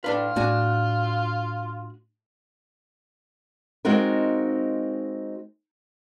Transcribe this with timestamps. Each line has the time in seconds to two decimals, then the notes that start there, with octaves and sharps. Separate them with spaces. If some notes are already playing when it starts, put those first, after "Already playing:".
0.04 A2 D4 F4 B4
0.36 A2 D4 F#4 G#5
3.85 G#3 C4 D#4 F4 F#4 A#4